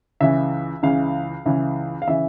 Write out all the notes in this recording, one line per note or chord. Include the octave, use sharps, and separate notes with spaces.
C#2 C#3 E3 E5
C#2 C#3 E3 F5
C#2 C#3 E3
F5
C#3 E3 E5